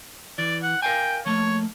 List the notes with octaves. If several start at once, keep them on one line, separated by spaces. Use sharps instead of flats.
E3 D5
F#5
A#4 F5 G5 G#5
F3 A3 A#3 C#5